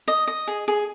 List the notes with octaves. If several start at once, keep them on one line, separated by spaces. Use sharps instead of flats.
D#5
D#5
G#4
G#4